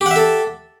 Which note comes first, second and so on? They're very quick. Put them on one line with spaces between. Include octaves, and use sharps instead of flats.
G4 F#5 E5 A4